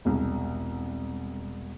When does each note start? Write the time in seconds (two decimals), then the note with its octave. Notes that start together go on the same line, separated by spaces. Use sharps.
0.05 E1 C2